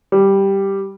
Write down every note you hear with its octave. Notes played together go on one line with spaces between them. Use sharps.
G3